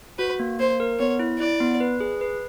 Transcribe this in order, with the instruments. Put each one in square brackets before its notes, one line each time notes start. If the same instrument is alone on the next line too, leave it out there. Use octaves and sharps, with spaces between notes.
[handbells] F#4 [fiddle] B4
[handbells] A#3
[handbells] A#3 [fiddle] C5
[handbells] A#4
[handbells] B3 [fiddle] C#5
[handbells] E4
[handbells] E4 [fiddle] D5
[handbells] B3
B4
G#4
B4